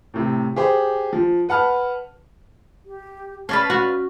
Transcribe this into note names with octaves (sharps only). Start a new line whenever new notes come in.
A2 C3
G4 G#4 C5
F3
B4 F#5 A5 F6
G4
C#4 B4 D5 F5 A5
F#4 F6